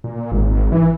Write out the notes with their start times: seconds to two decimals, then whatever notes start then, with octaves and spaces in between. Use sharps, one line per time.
0.04 A#2
0.32 G#1
0.72 E3